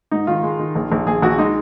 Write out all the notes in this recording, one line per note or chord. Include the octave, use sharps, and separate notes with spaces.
G#2 D#4
D#3 F4
G#3
D#3
A#1
A#1
A#1 G#4
A#1 F#4
G#3 D#4